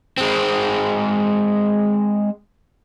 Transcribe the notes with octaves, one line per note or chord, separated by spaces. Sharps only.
G#3 C4